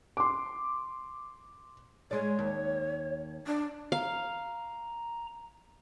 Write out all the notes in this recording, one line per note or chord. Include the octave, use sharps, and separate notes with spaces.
C6 D6
G#3 C#5 D5
D#2
D4
F5 A#5